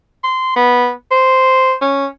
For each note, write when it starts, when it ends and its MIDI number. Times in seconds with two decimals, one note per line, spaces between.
0.24 0.54 84
0.56 0.91 59
1.11 1.74 72
1.81 2.06 61